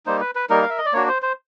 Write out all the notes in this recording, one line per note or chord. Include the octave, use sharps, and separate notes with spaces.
G3 A#3 D#4 C5
B4
B4
G3 A#3 D#4 A#4
F5
E5
D#5
D5
A#3 D4 F#4 C#5
C5
C5